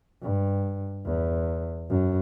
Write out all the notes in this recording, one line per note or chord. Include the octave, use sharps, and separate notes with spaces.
G2
E2
F#2